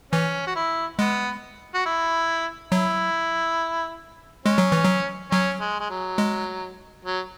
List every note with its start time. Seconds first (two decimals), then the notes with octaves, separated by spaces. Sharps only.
0.12 E3 C#4
0.47 F#4
0.56 E4
0.99 G#3 B3
1.75 F#4
1.86 E4
2.71 F#3 E4
4.46 G#3 C#4
4.58 F#3
4.72 E3
4.85 F#3
5.31 F#3 C#4
5.60 G#3
5.80 G#3
5.90 F#3
6.18 G#3
7.05 F#3